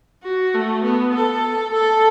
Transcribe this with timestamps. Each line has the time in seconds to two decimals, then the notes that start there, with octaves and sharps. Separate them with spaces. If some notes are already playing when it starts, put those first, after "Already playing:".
0.23 F#4
0.54 A3
0.84 B3
1.14 A4
1.74 A4